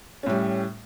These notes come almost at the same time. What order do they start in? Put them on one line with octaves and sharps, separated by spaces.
C#4 A2 G3